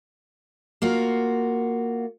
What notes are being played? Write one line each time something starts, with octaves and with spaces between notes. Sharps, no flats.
A#3 F4 F#4